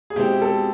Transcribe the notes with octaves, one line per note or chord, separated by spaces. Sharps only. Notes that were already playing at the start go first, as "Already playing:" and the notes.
G#4
B2 G#3 C4 E4 G4
A4